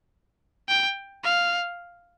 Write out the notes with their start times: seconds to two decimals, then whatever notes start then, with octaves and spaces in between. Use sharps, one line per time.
0.68 G5
1.24 F5